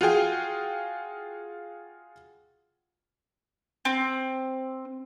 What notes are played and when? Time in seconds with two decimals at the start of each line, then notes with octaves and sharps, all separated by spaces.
0.01 F4 F#4 G#4 G5
3.85 C4